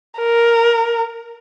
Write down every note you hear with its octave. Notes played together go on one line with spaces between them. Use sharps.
A#4